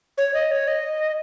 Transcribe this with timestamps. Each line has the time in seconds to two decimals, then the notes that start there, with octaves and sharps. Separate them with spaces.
0.18 C#5
0.34 D#5
0.51 C#5
0.68 D#5